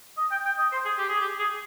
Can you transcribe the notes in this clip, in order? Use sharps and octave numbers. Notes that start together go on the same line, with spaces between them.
D#5
G5
G5
D#5
C5
G#4
G4
G#4
G4
G#4